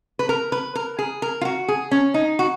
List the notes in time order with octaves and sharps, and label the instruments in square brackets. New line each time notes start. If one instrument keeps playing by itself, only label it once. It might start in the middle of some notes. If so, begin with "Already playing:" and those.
[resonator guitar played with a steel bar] B4
A#4
B4
A#4
G#4
A#4
F4
F#4
G#4
C#4
D#4
F#4